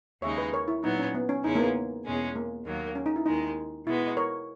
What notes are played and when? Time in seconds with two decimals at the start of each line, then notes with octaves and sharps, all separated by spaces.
0.22 D#2 C#3 G#3 D#4 C#5 E5
0.38 B4 D#5
0.53 A#4 C#5
0.68 E4
0.83 A#2 F#3 B3 D#4
0.99 C#4
1.14 B3
1.29 C#4
1.44 E2 C#3 G#3 C#4 D#4 E4
1.55 A#3
1.59 B3
2.05 E2 B2 G#3 C#4 G#4
2.36 A#3
2.65 D#2 D#3 F#3 A#3
2.95 C#4
3.06 D#4
3.16 E4
3.26 D#2 D#3 G#3 D#4
3.86 B2 G#3 B3 E4 F#4
4.08 D#5
4.17 A#4 C#5